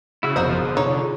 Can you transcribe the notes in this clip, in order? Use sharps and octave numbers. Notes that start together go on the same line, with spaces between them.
C#3 E4 F#4 E6
G1 F2 C3 B3 F#4 A#4 C5 D#5
F3 F4 G#4
D3
C3 D4 D#4 C#5